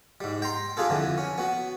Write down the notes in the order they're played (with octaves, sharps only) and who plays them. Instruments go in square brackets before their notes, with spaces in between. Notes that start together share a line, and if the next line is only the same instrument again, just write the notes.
[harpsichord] G#2 G3
G5 A#5 C6
G3 D4 F4 G#4 A4
F2 D3 E3
C#4
B3 F#4